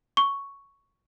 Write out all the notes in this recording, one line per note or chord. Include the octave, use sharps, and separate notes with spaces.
C#6